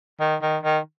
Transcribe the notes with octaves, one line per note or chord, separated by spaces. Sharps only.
D#3
D#3
D#3